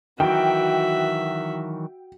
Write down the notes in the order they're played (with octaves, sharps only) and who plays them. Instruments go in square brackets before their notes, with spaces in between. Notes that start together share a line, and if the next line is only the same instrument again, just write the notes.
[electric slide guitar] D#3 E3 F#3 [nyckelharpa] F#4 E5 [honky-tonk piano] G5